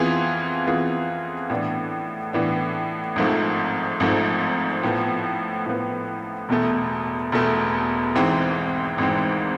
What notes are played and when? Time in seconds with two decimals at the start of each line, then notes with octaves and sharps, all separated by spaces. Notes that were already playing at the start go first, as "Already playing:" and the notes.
Already playing: F2 E3 B3 F4 G#4
0.67 F2 E3 B3 F4 G#4
1.50 A2 E3 B3 D4
2.33 A2 E3 B3 D4
3.16 G#1 G#2 F3 A3
4.00 G#1 G#2 F3 A3
4.83 A2 F3 B3
5.66 A2 F3 B3
6.49 E1 E2 B2 A3
7.32 E1 E2 B2 A3
8.15 G#1 G#2 E3 G#3 C4
8.98 G#1 G#2 E3 G#3 C4